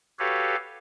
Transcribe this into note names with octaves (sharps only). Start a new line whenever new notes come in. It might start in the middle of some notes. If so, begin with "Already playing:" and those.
F#4 G4 A4 B4 C#5 F5